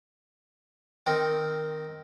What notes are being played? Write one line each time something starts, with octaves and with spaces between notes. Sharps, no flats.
D#3 C4 D#4 A#4